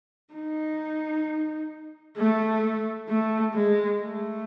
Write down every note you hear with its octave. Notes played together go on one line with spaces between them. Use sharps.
D#4
A3
A3
G#3
A3